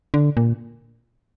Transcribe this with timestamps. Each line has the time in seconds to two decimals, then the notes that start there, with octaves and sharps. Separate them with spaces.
0.14 D3
0.37 A#2